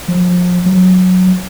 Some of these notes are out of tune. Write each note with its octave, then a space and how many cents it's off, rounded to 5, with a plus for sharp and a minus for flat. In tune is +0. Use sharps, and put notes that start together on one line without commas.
F3 +35
F#3 -10